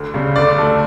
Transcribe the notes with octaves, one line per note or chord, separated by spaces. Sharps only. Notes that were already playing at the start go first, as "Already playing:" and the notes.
Already playing: D2
C#3 G3
D2 D5
D3 A3